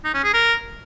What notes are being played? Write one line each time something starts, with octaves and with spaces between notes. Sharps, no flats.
D#4
C#4
G#4
A#4